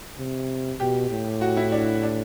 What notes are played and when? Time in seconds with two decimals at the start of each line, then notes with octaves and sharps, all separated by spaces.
0.18 C3
0.79 B2 G4
1.10 A2
1.41 F#4
1.57 E4
1.72 D4
2.03 D4